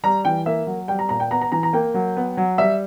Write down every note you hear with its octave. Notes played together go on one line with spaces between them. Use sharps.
G3 A#5
E3 G5
A#3 E5
F#3
G3 G5
A#5
A#2 A#5
G5
B3 A#5
A#5
E3 A#5
A#5
A#3 G5
F#3
B3
F#3
G3 E5